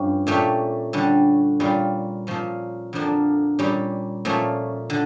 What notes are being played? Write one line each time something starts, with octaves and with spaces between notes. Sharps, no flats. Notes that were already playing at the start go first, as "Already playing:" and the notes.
Already playing: G2 F3 C#4 G4
A#2 A3 C#4 G4
D3 G3 C#4
A#2 G3 C#4 F4
A#2 F3 C#4
F2 D3 F3 A#3 D4
A#2 G3 C#4 G4
A#2 F3 A3 C#4
D3